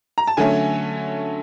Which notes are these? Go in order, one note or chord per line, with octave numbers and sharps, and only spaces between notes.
A#5
A5
D3 F#3 A3 C#4 G#5